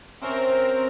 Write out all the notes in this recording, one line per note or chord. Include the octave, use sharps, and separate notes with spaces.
C3 C4 C#4 A#4 C#6